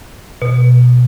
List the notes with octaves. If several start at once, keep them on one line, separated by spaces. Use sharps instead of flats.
B2